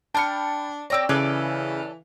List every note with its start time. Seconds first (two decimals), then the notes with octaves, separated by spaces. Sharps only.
0.15 D4 G5 A5 B5 F6 C#7
0.90 C4 G4 C#5 D5 A#5 E6
1.09 C#3 E3 A4 C#5 D5